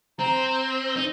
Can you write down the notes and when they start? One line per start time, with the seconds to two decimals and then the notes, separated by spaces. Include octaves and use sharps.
0.19 C4 A#5
0.97 D#4